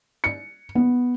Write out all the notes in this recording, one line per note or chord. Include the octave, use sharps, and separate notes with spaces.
C#7
B3